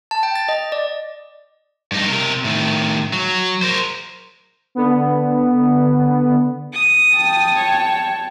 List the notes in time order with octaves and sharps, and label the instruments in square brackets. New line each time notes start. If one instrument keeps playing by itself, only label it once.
[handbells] A5
G5
A6
D#5
D5
[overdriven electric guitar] G2 D#4
C3 A#4
A2 D#3
F#3
A#4 C5
[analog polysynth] D3 B3
[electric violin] D#6
[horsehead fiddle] G5 A5
[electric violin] C#5